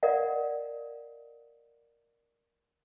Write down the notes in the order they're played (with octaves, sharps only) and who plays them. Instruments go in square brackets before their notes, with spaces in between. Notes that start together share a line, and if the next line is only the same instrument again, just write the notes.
[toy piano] A#4 D5 D#5 F5 F#5